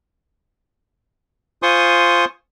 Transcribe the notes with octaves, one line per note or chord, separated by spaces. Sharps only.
F4 C5 G#5 C6 C#6 D#6